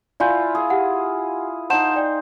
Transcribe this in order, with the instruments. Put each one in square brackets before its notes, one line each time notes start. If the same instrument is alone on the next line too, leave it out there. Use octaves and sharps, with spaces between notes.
[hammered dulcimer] E4 F4 [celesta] D5 G#5 G6
[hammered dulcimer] G#4
[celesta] G4 F#5
[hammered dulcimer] D#4 C5 [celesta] F#5 A5 E7
[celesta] D5 G5